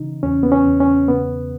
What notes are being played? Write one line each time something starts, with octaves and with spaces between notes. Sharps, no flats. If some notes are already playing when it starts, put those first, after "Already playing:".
Already playing: C#3 E3 D#4
E2 C#4
B3
C#4
E2
C#4
C#3 B3